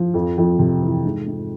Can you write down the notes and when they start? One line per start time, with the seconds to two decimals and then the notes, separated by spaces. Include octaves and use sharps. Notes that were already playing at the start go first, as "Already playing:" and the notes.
Already playing: F3
0.14 F2
0.38 F2
0.59 C3
0.83 E3
1.05 G#2
1.27 G#2